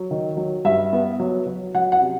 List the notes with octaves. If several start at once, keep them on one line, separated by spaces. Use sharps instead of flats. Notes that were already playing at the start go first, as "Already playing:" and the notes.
Already playing: F#3
D#3
F#3
G2 E5
B3
F#3
F#3
F#3 F#5
F#5
C3